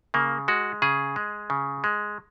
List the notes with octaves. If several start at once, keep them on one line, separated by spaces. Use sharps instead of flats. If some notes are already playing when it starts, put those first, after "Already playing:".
C#3 A#3
G#3 F#4
C#3 G#4
G#3
C#3
G#3